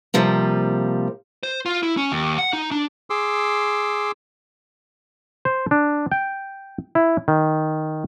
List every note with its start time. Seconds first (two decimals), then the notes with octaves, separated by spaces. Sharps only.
0.14 C3 F3 G3 A#3
1.43 C5
1.66 F4
1.83 E4
1.97 C#4
2.12 D#2
2.38 F#5
2.53 D#4
2.71 D4
3.10 G#4 C6 D6 E6
5.45 C5
5.71 D4
6.12 G5
6.95 E4
7.28 D#3